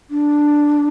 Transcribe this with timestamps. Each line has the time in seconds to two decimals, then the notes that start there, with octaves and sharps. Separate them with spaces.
0.10 D4